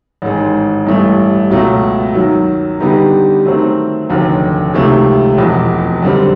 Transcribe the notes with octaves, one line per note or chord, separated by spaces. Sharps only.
A1 G#2 D#3 G#3
A1 G2 E3 A3
C#2 B2 F#3 A3
F#2 D#3 F#3
D3 G3 B3 D#4 G4
D#3 F#3 A3 C4
F1 D#2 D3 F#3
C#2 C3 D#3 F#3 A3
F1 E2 B2
F#2 D3 G3 C4